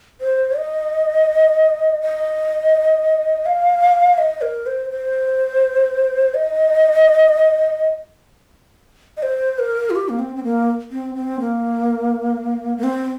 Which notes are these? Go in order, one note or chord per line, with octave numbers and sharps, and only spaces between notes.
C5
D#5
D#5
F5
D#5
A#4
C5
C5
D#5
D#5
C5
A#4
F4
G4
A#3
C4
C4
A#3
C4
C4
A#3
A#3
C4